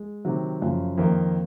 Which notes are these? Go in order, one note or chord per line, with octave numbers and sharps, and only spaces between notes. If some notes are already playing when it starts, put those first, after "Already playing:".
Already playing: G#3
C3 D#3 F#3
F#2 C#3 F3
F2 D#3 A#3 D#4